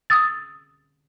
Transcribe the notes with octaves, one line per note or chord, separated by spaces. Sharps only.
D#6 E6 A6